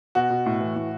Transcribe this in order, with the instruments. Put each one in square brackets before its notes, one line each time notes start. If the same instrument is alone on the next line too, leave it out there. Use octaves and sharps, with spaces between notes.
[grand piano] B2 F#4
B2
A2
E3
A2